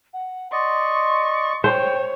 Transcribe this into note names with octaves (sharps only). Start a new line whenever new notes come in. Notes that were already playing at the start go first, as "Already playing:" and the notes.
F#5
D5 D#5 C6 C#6
C5 C#5 G5